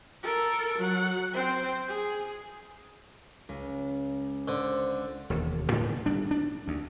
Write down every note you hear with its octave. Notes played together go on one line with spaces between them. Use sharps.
A4 A#4
F#3 F#5
C4 C5
G#4
C#2
D3 C5
E1 D#2
A2 D3 D#3 G#3
G1 G3 D4
D4
D2